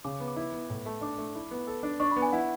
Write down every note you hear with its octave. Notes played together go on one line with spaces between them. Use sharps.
C#3 D6
B3
D6
E4
B3
A2
A3
D4 D6
A3
E4
B3
A4
D4
D4 C#6
B3 B5
G#5
E4 F#5